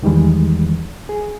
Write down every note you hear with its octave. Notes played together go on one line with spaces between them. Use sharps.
E2 D#3 E3 G3 G#3
G#4